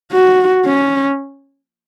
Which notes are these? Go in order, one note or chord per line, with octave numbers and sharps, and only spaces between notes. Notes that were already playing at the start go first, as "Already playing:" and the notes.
F#4
C#4